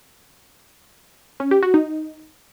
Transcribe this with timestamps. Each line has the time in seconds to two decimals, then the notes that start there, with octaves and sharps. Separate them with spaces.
1.40 C#4
1.51 G4
1.63 F#4
1.74 D#4